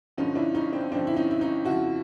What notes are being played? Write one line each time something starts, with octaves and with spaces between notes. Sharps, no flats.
G2 D3 F3 C#4 D#4
D4 E4
C#4 D#4
C4 D4
G2 D3 F3 C4 D4
E4
C#4 D#4
E4
C#4 D#4
F2 C#3 F3 E4 F#4